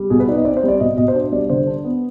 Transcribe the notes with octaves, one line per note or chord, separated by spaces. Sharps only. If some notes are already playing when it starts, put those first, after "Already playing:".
Already playing: G3
B2 G#4
B4
D#4 D5
D#5
C4 D5
C5
G3 D5
B2 D#5
B2 D#5
C5
D4 D5
G3 D5
D3 C5
D4
B3